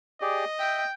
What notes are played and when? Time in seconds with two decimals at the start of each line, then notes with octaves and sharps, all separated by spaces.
0.21 G4 G#4 D5 D#5
0.59 E5 G5